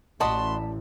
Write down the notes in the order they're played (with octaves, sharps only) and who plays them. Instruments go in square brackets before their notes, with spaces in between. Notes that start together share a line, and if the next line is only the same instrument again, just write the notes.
[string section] A1 [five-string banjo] E4 F#4 D#5 [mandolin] D5 A5 B5 [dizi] C6